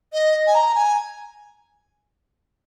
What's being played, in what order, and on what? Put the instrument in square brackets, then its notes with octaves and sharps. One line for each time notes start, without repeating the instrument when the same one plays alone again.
[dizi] D#5
G#5
A#5
G#5